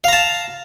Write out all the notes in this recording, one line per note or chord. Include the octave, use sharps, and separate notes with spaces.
F5 A5 A#5